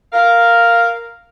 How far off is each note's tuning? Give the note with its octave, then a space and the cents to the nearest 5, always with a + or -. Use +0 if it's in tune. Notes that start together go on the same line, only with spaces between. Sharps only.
A#4 +0 F5 +0